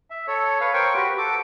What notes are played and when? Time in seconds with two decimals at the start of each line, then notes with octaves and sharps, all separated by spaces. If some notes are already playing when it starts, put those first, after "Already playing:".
0.10 E5
0.28 A4 C#5
0.61 B4 C#5 F5
0.74 A#4 C5 G5 C#6
0.95 F#4 G4 B4
1.18 A4 D6